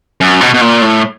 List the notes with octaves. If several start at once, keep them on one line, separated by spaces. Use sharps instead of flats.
F#2
B2
B2
A#2
A2